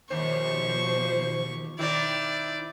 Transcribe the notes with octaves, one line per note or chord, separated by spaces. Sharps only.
D#2 B2 F3 C5 C#6
D#3 C4 E4 D5